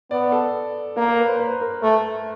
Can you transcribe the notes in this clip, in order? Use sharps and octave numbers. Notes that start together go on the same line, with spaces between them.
B3 D5
A4
A#3 A#4
A#4
B4
C5
B4
A#4
A3